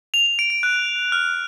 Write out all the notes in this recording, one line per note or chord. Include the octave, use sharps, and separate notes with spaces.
F7
F7
D7
D7
F#6
F6